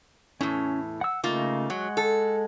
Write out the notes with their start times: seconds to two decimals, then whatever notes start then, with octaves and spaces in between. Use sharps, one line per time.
0.41 E2 A2 C#4
1.01 F#5 E6
1.24 C#3 A3 A#3 D#4 F4
1.70 F#3 G#3 F#5
1.97 A4